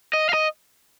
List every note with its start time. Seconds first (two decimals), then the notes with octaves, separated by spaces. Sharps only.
0.13 D#5
0.29 F5
0.33 D#5